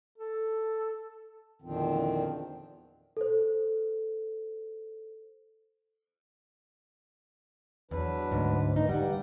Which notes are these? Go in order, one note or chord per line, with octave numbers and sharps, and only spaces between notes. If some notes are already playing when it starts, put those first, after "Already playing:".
A4
E2 A#2 D3 D#3 F3 C4
A4 C5
E2 F#3 D4 B4
D2 G#2
A#2 E3 A#3 D#4
G2 G3 F#5